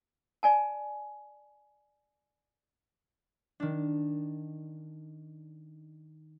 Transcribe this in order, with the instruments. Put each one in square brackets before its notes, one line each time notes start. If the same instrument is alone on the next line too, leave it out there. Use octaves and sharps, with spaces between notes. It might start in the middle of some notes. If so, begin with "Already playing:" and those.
[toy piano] D5 G#5 A5
[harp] D#3 D4